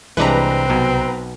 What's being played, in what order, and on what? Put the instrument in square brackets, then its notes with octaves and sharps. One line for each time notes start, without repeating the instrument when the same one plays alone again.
[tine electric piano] C2 C3 [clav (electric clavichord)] E3 G#3 D4 [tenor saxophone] C4 [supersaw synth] B4 A#5
[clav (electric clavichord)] B1 B2